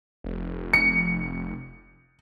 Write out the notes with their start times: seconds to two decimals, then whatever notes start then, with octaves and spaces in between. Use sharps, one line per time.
0.24 F1
0.73 C#7